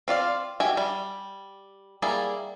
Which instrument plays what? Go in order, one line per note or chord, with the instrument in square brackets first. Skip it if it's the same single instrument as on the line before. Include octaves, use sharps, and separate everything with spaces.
[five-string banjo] C4 F4 D5 F5
F#4 G4 E5 G5 G#5
G3
G3 A#3 E4 G#4 D5